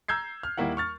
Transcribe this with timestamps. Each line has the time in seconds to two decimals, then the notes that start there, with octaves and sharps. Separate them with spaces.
0.08 A#5 E6 G6 G#6 C7
0.43 F6
0.57 D#2 G3 A#3 E4 F#5
0.77 C#6 F6 A6